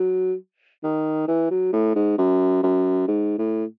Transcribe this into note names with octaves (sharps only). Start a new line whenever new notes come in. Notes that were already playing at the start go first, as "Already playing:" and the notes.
Already playing: F#3
D#3
E3
F#3
A2
G#2
F#2
F#2
G#2
A2